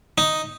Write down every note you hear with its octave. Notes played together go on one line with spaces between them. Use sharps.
D#4